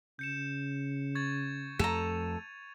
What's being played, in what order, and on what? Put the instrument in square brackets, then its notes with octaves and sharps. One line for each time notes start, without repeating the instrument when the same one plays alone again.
[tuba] C#3 [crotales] G6 C#7 E7
[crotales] C#6 G#6 A6
[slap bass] F2 A3 [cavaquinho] A4 A#5 [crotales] D#7 F7